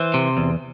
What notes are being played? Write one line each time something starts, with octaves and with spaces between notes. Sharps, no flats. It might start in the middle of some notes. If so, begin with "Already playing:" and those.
Already playing: E3 C5
C3
E2